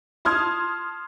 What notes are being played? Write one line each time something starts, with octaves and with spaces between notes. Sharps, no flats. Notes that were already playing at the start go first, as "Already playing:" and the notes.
A5 C6 D#6 F6 G#6